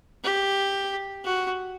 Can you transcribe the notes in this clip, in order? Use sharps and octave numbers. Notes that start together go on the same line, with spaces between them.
G4
F#4